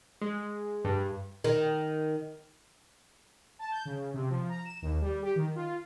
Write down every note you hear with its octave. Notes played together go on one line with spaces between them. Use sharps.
G#3
G2
D#3
A5
G6
C#3
C3
F3
A#5
E7
D#2
G3
G4
D#3
F4